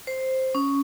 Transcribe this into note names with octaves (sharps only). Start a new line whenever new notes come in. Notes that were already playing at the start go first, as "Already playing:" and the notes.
C5
C#4